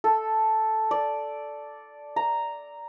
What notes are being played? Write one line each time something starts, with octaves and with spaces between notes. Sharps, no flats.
A4
D5
A#5